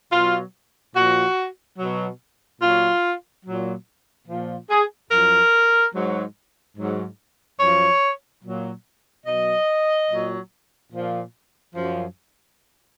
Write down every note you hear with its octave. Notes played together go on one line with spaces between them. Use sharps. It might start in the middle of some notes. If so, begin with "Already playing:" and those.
B2 F#3 F4
A#2 F3 F#4
B2 F#3
A#2 F#3 F4
A#2 F#3
A#2 F3
G#4
F#2 F3 A#4
G#2 F#3
G#2 F#3
F#2 F3 C#5
A#2 F#3
B2 F#3 D#5
A#2 F#3
A#2 F3
F#2 F3